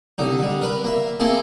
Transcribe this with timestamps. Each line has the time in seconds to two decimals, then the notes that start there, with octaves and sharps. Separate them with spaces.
0.18 C2 D3 D#4
0.39 D3 G3
0.61 A#4 B4
0.84 A#3 E5
1.20 A#3 C4 E4 G#4 A4